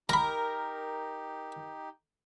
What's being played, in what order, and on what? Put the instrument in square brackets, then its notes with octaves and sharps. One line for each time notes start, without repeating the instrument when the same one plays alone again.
[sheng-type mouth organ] D#4 G4 [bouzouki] A#4 [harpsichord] A#5 B5